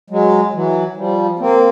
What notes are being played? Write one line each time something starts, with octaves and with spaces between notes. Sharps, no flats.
F#3 G#3
E3 F#3
F3 G3
A#3 C4